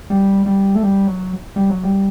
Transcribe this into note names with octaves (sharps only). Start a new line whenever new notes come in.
G3
G3
A3
G3
F#3
G3
F#3
G3